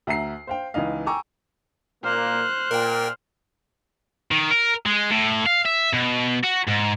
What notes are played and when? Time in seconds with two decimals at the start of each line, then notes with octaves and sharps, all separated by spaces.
0.07 D2 E5 A#5 C7
0.47 C5 F5 G5
0.74 C#2 E3 D#4 D#5 F5
1.06 G5 G#5 A#5 C#6 D6 E6
2.04 A#2 A#3 C5 F6 F#6
2.71 A#2 A#4 G5
4.31 D#3
4.51 A#4
4.86 G#3
5.11 A2
5.46 F5
5.65 E5
5.93 B2
6.43 F#4
6.67 G#2